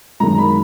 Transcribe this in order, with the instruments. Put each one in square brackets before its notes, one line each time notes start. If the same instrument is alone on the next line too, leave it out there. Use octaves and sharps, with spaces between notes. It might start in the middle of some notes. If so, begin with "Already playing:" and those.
[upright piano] F#2 D#3 G#3 A#5
B5